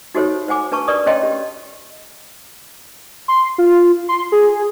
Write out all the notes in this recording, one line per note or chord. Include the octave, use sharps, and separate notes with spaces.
D#4 F#4 G4 A4 C5 C#5
C5 F#5 G#5 D6
D4 B4 A5 C#6
G4 A#4 B4 D5 C#6 D#6
C#4 C#5 D#5 G5 A5 C6
G4
C6
F4
C6
G#4